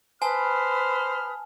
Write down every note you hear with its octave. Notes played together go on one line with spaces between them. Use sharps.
B4 C5 G#5 A5 B5 D#6 F6